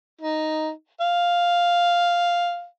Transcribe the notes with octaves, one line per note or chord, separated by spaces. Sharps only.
D#4
F5